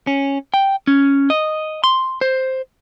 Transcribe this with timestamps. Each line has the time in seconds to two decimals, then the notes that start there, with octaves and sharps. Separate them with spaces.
0.07 C#4
0.54 G5
0.87 C#4
1.30 D#5
1.84 C6
2.21 C5